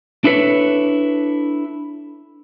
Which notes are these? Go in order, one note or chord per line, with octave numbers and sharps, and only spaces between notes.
D4 E4 A4 B4 C#5